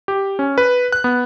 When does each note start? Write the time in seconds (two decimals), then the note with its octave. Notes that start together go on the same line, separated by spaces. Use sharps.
0.08 G4
0.39 C#4
0.58 B4
0.92 F#6
1.04 B3